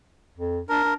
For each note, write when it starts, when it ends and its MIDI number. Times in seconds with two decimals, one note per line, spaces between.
0.37 0.60 41
0.69 0.84 62
0.69 0.94 70
0.84 0.95 62